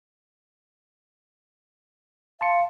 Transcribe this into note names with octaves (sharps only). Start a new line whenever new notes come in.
F5 A5 C6 C#7